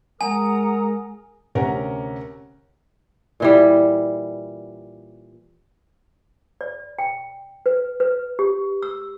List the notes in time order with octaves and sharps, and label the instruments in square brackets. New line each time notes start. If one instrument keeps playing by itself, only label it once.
[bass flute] G#3 [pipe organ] A#4 [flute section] F#5 A#5 D#6 [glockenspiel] G#5
[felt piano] D2 C3 C#4 A#4 F#5 A#5
[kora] A#2 E3 G3
[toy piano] D5
G5
B4
B4
G4
E6